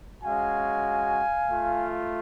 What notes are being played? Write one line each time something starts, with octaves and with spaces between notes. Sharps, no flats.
G#3 C#4 F#4 F5 G#5
A3 F4